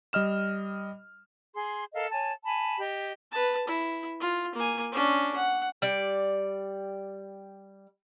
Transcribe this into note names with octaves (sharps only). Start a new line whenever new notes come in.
G3 D#5 F6 E7
G#4 C6
A4 A#4 D#5 F5
C#5 G#5 A5
G#5 A5 B5
G4 D#5
B4 A5
E4
F4
A#3 G#5
C#4 D4
F#5
G3 D5